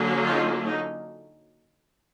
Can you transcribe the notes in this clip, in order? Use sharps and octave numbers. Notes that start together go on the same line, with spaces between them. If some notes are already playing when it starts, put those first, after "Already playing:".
Already playing: D3 F#3 A#3 C#4
D#4 F4
D#4